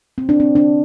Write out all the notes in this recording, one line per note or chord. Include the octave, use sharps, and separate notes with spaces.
C4
D4
C4
D4